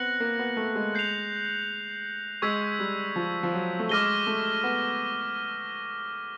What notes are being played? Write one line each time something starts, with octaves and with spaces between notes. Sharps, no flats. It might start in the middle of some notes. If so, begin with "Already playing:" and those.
Already playing: B3 C4 F#6 A#6 C#7 F#7
A#3
B3
A3
G#3
G6 C7 F7
G#3 C#6 E6 G#6 B6
G3
F3
F3
F#3
A3
G#3 D6 F6 A#6 D#7 G7
A3
B3